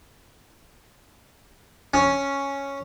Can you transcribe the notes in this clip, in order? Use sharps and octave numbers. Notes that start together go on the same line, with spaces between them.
C#4